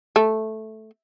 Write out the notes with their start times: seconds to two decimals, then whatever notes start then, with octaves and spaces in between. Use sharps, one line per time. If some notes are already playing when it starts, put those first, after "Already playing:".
0.16 A3